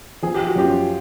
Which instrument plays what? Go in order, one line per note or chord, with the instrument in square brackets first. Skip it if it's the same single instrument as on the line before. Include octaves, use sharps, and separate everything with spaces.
[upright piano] F3 [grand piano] G#4
[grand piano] G4
F#4
[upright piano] F#2 [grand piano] F4 G4